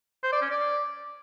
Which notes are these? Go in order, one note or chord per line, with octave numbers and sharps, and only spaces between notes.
C5
D5
C#4
D5